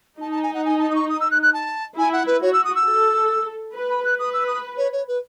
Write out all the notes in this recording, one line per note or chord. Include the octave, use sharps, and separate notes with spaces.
D#4 A5
A5
G#5
F#5
G#5
A5
D#6
C#6
D#6
E6
F#6
F#6
A5
E4 G#5
F#5
B4
F#4 C#5
E6
D#6
E6
A4
B4
B5
F#6
B4 D#6
E6
D#6
C#5
C#5
B4